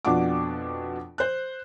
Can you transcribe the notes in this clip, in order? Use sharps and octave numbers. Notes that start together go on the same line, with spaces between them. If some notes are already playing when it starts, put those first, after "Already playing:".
F2 B2 D4 F4 F#5 D6
C5 F#6